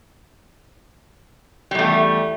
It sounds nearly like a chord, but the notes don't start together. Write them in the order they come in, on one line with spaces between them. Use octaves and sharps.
G3 E2 A3